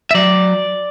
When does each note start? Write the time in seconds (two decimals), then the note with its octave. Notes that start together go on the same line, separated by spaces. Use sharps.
0.11 E5
0.15 F#3 D5